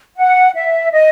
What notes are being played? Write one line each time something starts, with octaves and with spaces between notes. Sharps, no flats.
F#5
E5
D#5